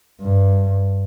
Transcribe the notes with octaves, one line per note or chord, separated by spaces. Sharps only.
G2